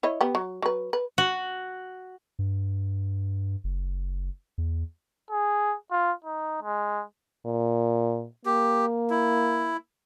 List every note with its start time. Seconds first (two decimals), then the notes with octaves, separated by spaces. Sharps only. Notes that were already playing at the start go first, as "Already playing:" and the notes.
0.03 E4 C#5 D#5
0.21 B3 G4
0.35 F#3
0.62 F#3 B4
0.93 B4
1.18 F#4
2.39 G2
3.64 F#1
4.58 E2
5.31 G#4
5.91 F4
6.25 D#4
6.63 G#3
7.45 A#2
8.46 A#3 G4
9.10 E4